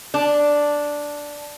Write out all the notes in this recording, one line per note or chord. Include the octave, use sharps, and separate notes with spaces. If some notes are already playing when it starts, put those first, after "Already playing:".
D4